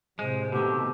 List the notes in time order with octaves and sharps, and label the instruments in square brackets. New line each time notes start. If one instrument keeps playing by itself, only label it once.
[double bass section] A2 C3 [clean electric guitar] G#3 [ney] C5
[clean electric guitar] B2 D#3 [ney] A3 [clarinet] G4